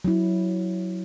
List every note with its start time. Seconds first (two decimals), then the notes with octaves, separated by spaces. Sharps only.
0.05 F#3 E4